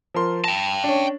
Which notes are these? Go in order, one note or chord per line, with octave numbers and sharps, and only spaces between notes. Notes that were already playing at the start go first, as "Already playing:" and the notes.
F3 A#4 C6
G5 A5 A#6
C#4 D4